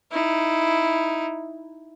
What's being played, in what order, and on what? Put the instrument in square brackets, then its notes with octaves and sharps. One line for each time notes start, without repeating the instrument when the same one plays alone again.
[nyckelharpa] D#4 E4